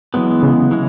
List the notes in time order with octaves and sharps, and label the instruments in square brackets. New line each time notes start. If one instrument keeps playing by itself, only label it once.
[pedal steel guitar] E3 G#3 B3 [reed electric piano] F#3
[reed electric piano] C#3
[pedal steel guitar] E3 G#3